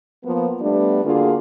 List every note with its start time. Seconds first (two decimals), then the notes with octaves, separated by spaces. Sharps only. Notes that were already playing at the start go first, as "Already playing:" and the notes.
0.24 F3 A#3 B3
0.61 G3 A3 B3 D4
1.04 D3 A#3 F4 F#4 G#4